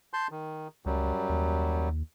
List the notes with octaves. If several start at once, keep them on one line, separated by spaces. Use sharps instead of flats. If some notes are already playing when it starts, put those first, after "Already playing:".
A5 C6 G6
D#3
C#2 F#2 F#3 G3
D#2